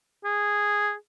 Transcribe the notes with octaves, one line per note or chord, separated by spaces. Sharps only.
G#4